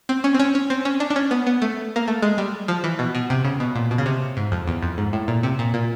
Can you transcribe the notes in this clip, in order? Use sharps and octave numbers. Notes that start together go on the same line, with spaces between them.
C4
C#4
C4
C#4
C#4
C4
C#4
D4
D4
C#4
B3
B3
A3
A#3
A3
G#3
G3
F3
E3
B2
B2
C3
C#3
B2
A#2
B2
C#3
C3
G#2
F2
E2
F2
G#2
A2
A#2
C3
A#2
A#2